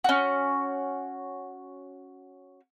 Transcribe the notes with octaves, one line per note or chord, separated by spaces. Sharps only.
C#4 F#4